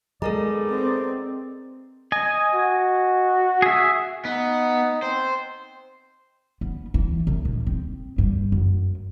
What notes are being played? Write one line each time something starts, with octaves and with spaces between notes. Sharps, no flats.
G#3 B3 D#4 A4 A#4 D5 A#5
C4
D#5 G#5
F#4
G#4 E5
B3 D#4
C4 C5
B3
E3
C2
A#1
C4
G2
F#2